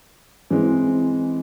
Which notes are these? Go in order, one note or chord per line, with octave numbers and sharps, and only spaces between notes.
E3 G#3 C4